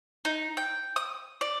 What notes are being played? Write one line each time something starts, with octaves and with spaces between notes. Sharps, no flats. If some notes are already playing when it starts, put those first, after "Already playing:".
D#4
G5
D#6
D5